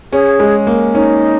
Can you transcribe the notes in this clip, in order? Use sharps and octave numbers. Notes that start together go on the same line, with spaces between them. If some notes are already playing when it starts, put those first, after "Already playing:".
C#4 G#4
G#3
A#3
C#4 D#4